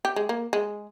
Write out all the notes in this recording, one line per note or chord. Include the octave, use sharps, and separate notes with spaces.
G4
G#3
A#3
G#3